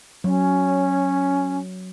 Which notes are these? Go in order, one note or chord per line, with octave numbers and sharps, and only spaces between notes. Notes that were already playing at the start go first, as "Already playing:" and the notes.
F#3 C#4